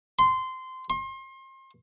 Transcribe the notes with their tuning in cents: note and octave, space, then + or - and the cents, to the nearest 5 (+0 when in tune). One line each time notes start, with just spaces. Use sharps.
C6 -15
C6 +35